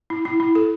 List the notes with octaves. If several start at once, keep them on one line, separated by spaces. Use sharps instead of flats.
E4
E4
E4
A4